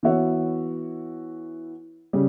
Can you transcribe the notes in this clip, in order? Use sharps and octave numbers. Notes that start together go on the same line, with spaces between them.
E3 B3 F#4 C#5 E5
C#3 G3